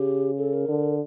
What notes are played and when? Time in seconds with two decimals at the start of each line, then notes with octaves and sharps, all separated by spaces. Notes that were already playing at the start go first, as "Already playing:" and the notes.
Already playing: C#3 G4
0.38 A4
0.53 A#4
0.68 D3